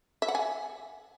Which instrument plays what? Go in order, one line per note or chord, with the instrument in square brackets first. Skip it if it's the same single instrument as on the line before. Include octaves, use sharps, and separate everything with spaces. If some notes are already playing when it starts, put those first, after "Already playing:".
[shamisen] E5
F#5
G#5